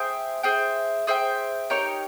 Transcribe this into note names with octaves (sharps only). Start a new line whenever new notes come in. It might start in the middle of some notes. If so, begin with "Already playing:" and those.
Already playing: G#4 C5 E5 G5
G#4 C5 E5 G5
G#4 C5 E5 G5
D#4 G4 A#4 C#5